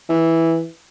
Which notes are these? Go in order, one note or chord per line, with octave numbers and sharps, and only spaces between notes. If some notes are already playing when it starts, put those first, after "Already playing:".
E3